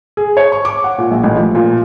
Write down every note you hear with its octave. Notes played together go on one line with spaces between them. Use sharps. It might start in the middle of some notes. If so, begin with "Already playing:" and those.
G#4
C#5
C#6
D6
F#5
A#2
A#1
A1
F3
A#2